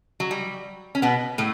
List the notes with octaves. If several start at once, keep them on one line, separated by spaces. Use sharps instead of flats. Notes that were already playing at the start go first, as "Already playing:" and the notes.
F#3
G3
C#4
B2 B3
A2 A3